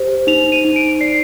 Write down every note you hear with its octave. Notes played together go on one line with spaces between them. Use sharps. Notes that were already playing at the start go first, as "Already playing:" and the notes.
Already playing: G4 C5
D#4 F7
D#7
D#4
D7
D5 C7